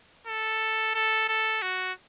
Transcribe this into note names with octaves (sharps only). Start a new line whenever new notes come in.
A4
A4
A4
F#4